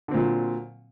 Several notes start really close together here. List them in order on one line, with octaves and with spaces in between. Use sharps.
D3 C4 A#2 F#3